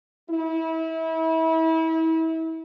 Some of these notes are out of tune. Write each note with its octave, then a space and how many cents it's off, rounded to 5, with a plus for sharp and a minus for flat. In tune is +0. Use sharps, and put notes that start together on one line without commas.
E4 -30